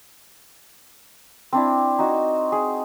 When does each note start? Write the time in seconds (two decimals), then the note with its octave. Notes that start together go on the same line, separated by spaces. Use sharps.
1.53 C4 D4 E4
1.99 D#4 F#4
2.52 G#4